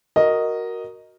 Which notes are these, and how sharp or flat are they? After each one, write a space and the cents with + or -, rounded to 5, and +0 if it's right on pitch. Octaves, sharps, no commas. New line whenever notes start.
F#4 +0 A#4 +0 D#5 +0